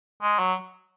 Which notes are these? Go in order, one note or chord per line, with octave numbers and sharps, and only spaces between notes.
G#3
F#3